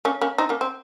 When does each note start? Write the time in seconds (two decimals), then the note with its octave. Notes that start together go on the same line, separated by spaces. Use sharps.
0.05 A#3 C#4
0.21 A#3 C#4
0.38 C4 D#4
0.49 A#3 C#4
0.61 C4